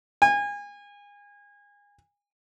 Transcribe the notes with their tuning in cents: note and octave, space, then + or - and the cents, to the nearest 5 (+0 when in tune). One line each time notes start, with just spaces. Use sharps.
G#5 -30